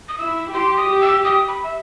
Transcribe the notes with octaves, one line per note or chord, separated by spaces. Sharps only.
D#6
E4 E6
G4 C6
D#6
G4
E6
D#6
B5
E5